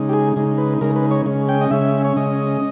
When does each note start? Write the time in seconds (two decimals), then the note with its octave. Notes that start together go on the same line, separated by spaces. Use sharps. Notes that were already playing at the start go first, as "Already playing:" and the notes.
Already playing: C#3 G#3 D#4
0.09 G4
0.13 G#4
0.36 C#3 G#3 D#4
0.58 B4
0.81 C#3 G#3 D#4 A#4
0.96 B4
1.11 C#5
1.26 C#3 G#3 C#4
1.49 G5
1.61 D#5
1.71 C#3 G#3 C#4 E5
2.04 C#5
2.16 C#3 G#3 C#4 D#5